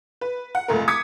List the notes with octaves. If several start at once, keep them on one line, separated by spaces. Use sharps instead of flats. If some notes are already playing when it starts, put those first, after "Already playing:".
B4
F#5
F1 C#2 A3 A#4
D6 D#6 G#6 B6 C#7